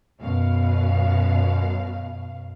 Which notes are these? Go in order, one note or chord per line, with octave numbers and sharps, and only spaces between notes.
F#2 B2 F5